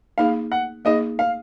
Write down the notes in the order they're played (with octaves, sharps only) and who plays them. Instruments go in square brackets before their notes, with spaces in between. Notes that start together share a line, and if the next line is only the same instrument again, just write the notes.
[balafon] A#3 D#4 G#4 [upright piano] F5
[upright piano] F#5
[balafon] A#3 D#4 G#4 [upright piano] D#5
[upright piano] F5